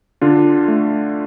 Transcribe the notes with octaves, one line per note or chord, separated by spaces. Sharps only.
D3 D4 F4
A3